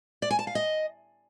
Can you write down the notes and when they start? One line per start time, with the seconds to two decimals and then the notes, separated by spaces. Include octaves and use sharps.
0.22 D5
0.31 G#5
0.39 A5
0.47 F5
0.55 D#5